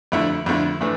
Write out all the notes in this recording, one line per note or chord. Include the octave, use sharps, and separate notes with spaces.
F2 D3 A3 E4
F2 D3 A3 E4
A2 E3 A3 D4